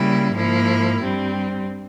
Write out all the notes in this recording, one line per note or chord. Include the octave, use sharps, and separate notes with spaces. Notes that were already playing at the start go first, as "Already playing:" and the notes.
Already playing: C#3 G3 A#3 E4
G#2 F3 A#3 E4
G2 G3 C4